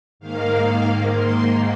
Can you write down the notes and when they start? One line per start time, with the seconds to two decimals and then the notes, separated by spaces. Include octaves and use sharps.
0.20 G#2 D#3 A#3 F5
1.12 C6